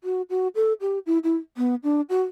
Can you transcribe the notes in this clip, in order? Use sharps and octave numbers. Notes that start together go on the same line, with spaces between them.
F#4
F#4
A4
G4
E4
E4
B3
D4
F#4